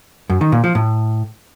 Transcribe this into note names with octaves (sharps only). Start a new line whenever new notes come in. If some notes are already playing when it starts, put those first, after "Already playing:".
F#2
D#3
A#2
F3
A2